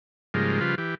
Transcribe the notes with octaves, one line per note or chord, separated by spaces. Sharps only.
G#2 C#3 F3 G3 G#3 A#3
C#3 F3 G3 F4 B4
E3 G4